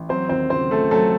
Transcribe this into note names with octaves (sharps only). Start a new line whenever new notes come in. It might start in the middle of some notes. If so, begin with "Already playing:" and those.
Already playing: A1
F#3 C4 C5
D#2 C4 C5
C#3 C4 C5
A3 A4
F#3 A3 A4